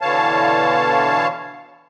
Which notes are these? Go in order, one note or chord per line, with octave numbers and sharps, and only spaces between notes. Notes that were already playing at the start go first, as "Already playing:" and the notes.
B2 D3 E3 C#5 F5 A5